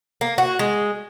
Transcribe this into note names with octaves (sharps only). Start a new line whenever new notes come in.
A#3
F#4
G#3